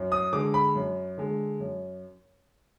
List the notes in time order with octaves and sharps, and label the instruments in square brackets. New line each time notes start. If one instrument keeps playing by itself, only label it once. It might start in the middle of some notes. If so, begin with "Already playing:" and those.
Already playing: [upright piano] F#2
D#6
D3 G#3 D6
B5
F#2
D3 G#3
F#2